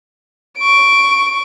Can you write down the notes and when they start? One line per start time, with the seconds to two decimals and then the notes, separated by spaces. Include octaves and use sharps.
0.58 C#6 D7